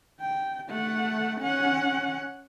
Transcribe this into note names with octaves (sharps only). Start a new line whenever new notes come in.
G5
A3 F#5
C#4 F#5